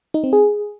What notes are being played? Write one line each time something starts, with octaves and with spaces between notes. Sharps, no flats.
D#4
C4
G#4